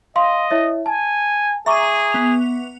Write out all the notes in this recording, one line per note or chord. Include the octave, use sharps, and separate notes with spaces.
D#5 F5 C6
E4 C#5 E5
G#5 A5
G#4 E5 A#5 C#6 D6 D#7
B3 F7